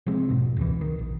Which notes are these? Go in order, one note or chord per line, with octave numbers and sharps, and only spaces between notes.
C3 F3 G#3 C4
E1 G#2 B2
E1 C#2 E3
D#3
A#1